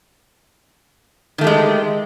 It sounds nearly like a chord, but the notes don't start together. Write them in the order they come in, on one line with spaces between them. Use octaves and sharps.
D#3 A3 G4 G#3